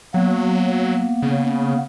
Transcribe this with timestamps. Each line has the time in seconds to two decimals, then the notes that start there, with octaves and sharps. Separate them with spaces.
0.14 F#3 A#3 B3
1.22 C#3